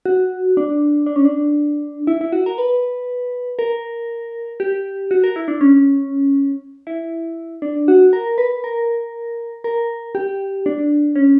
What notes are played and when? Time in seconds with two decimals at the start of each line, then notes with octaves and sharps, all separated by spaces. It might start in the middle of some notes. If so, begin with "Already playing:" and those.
0.05 F#4
0.57 D4
1.06 D4
1.16 C#4
1.25 D4
2.07 E4
2.21 E4
2.32 F#4
2.46 A#4
2.58 B4
3.59 A#4
4.60 G4
5.11 F#4
5.24 A#4
5.36 E4
5.48 D4
5.61 C#4
6.87 E4
7.62 D4
7.88 F#4
8.13 A#4
8.38 B4
8.64 A#4
9.64 A#4
10.15 G4
10.66 D4
11.16 C#4